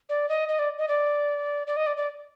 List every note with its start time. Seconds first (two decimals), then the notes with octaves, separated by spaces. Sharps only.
0.09 D5
0.29 D#5
0.49 D#5
0.59 D5
0.78 D#5
0.88 D5
1.67 D5
1.77 D#5
1.87 D5
1.97 D5